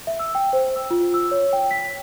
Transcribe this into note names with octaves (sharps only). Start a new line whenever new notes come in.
E5
E6
G5
C5
E6
F4
E6
C#5
G5
B6